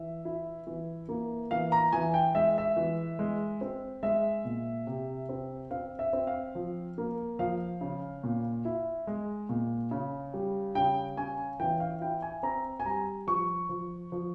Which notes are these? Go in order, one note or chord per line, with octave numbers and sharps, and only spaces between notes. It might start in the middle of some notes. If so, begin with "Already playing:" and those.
Already playing: E3 E5
E4
E3
A#3
E3 F5
A#5
E3 G#5
G5
G#3 E5
E5
E3
G#3
C4
G#3 E5
A#2
C3
C4
C4 F5
E5
C4
F5
F3
A#3
F3 F5
C#3
A#2
E4
G#3
A#2
C#3
G3
C#3 G5
C#4 G#5
E3 G5
F5
E4 G5
G#5
C4 A#5
G#5
G3 A#5
F3 C#6
F3
F3